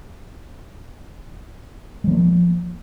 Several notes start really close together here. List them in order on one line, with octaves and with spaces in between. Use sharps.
G#3 F3 A#3